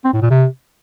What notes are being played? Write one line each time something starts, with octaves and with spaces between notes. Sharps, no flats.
C4
A2
A#2
C3